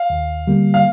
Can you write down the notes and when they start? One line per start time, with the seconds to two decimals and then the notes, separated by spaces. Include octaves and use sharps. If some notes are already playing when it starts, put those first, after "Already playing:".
Already playing: F5
0.10 D#2
0.47 D3 G3 A#3
0.74 F5